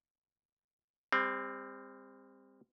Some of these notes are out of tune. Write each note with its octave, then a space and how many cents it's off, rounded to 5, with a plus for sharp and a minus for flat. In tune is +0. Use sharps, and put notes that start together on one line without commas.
G3 +40 C4 +0